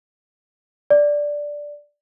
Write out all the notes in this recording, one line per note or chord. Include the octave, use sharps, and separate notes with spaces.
D5